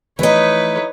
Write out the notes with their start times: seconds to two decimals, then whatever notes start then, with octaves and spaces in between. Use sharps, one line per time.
0.19 E3 F3 A3 D#4 E4 B4 C#5